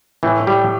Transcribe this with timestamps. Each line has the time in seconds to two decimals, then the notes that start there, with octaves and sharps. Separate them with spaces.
0.23 A2 E3
0.47 G3 G4